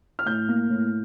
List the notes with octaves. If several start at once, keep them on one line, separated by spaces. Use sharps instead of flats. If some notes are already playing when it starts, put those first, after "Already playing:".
F6
A2 G6
A#3
A2